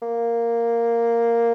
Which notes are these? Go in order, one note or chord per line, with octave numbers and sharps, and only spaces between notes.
A#3